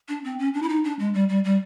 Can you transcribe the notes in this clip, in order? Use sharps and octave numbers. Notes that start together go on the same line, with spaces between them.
D4
C4
C#4
D4
E4
D#4
D4
G#3
G3
G3
G3